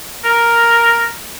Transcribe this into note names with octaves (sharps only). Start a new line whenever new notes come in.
A#4